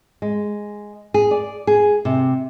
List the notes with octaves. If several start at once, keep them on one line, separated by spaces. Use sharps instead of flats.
G#3
G#4
D5
G#4
C3